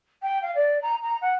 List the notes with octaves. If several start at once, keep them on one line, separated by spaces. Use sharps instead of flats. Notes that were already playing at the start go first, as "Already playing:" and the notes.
G5
F5
D5
A#5
A#5
F#5